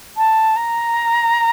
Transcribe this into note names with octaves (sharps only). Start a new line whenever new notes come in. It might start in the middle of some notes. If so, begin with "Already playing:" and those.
A5
A#5